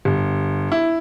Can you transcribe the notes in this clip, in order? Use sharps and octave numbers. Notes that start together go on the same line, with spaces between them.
G1
E4